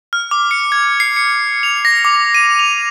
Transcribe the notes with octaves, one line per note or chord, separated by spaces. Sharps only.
F6
D6
C#7
G#6
C7
C#7
F7
A#6
D6
D#7
F7